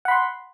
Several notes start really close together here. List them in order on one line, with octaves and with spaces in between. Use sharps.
F#5 B5 C6